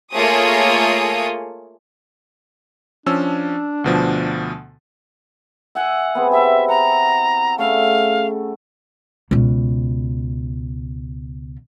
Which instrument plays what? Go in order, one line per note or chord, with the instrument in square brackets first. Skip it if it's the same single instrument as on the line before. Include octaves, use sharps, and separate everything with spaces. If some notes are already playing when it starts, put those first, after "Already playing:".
[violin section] A3 A#3 F4 G#4 C#5 D#6
[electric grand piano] F3 C#4 E6 [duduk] D4
[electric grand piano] D2 B2 F3
[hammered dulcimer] E5 G#5 [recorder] F#5
[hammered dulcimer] B3 C4 G#4
[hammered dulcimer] E4 G4 [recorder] E5
[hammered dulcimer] F#5 [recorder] A#5
[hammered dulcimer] C#3 A3 [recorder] F5
[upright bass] C#2 B2